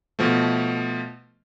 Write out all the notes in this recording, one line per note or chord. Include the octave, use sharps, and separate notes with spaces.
B2 F3 A3